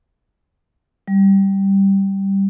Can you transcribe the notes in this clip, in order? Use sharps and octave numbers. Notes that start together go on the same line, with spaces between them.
G3